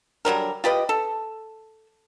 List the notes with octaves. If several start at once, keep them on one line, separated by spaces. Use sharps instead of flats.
D3 F#3 G3 A#4
F4 G4 B4 D#5
A4